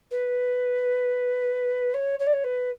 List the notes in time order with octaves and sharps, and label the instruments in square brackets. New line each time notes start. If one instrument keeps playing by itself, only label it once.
[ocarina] B4
C#5
C#5
D5
C#5
B4